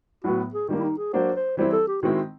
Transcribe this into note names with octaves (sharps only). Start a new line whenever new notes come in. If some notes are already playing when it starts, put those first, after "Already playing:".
A2 F#3 B3 F#4
G#4
D#3 G3 A#3 D4
E4
D#4
G#4
F#3 A#3 D4 F#4 C5
C5
E3 G3 C4 E4 C5
A4
G4
D#3 G#3 C4 E4 F#4